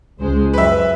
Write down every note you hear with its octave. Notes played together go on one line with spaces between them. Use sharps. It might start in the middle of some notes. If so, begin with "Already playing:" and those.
C#2 G#3 C5
F#2 B4 E5